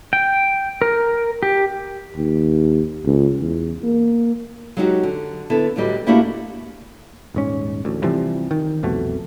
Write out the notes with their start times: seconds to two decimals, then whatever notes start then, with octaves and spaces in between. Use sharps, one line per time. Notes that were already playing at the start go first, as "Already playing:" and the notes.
0.13 G5
0.82 A#4
1.43 G4
2.16 D#2
3.05 C#2
3.40 E2
3.84 A#3
4.77 F#3 G#3 C#4 D#4 F#4 G4
5.03 D3
5.50 D3 B3 E4 A4
5.76 D2 A2 F#3 G3 G4 D#5
6.06 A3 A#3 D4 E4 F#4 G4
7.34 D#1 G#2 C#4
7.85 A1 D2
8.02 C3 E3 F3 G3
8.51 D#3
8.83 C2 F2 B2 A3